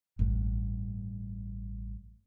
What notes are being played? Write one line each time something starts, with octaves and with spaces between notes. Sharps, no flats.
A1 G2